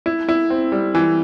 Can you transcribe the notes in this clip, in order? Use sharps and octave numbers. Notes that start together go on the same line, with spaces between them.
E4
E4
C4
G3
E3